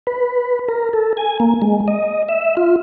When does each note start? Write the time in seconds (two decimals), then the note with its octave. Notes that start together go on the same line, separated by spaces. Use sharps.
0.07 B4
0.68 A#4
0.93 A4
1.17 G#5
1.40 A#3
1.62 G#3
1.88 D#5
2.29 E5
2.57 F4